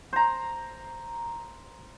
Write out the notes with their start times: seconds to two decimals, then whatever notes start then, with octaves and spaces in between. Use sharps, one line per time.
0.13 C5 A#5